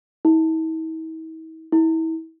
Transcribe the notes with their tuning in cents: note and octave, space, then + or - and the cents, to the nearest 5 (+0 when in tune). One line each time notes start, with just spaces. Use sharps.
E4 -45
E4 -30